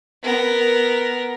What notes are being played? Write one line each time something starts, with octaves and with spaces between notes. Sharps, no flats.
B3 A#4